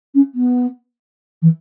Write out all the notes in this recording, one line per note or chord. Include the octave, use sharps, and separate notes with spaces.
C#4
B3
E3